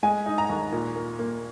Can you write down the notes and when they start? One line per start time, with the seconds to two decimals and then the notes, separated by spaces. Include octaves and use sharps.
0.03 G#3 G#5
0.26 D#4
0.38 A#5
0.50 D#2
0.72 A#2
0.95 A#3
1.19 A#3